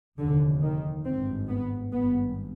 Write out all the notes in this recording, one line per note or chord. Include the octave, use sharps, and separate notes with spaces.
F1 D#2 D3
D#3
G#1 G2 C4
B3
G#1 G2 B3